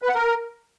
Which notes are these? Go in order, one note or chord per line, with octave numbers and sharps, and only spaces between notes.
B4
F#5
A#4